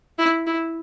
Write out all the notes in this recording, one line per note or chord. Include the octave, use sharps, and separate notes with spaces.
E4
E4